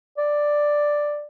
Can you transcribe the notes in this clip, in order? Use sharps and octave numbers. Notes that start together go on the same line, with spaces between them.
D5